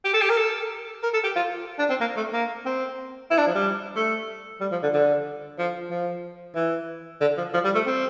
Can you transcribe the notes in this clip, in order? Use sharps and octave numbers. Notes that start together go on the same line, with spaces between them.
G4
A4
G4
A#4
A4
A#4
A4
G4
F4
D4
C4
A#3
A3
A#3
C4
E4
D4
F3
G3
A3
G3
F3
D3
D3
F3
F3
E3
D3
F3
F3
G3
A3
C4